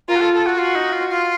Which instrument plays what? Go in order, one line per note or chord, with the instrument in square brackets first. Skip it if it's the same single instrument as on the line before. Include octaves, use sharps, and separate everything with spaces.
[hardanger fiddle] F4 [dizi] A#4
[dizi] F#4
A4
A4
F#4
[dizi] F4 [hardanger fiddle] F#4
[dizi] D#4
F4
F4